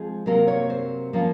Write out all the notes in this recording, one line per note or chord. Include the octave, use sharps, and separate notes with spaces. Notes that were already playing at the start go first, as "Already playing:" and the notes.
Already playing: F3 G#3 C4 G#4
C3 F#3 A#3 A#4
C#5
C5
F3 A#3 C#4